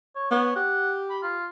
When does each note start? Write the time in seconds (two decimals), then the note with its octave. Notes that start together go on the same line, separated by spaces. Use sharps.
0.16 C#5
0.31 B3 C#5
0.56 G4 F#5
1.10 B5
1.22 F4